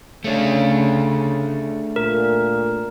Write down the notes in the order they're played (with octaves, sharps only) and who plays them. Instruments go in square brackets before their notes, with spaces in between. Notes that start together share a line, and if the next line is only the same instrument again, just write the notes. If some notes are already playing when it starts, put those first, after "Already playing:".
[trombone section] C#3 [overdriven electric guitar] A3 D4
[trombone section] A#2 [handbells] A#4